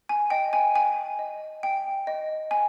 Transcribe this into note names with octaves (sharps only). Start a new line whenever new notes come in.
G#5
D#5 G5
G#5
G5 G#5
D#5
G5
D#5
G5 G#5